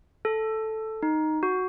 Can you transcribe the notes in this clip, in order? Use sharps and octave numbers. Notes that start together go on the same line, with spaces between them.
A4
D#4
F#4